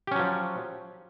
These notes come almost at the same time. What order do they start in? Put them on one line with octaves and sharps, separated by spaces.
G4 C#4 F#3 F3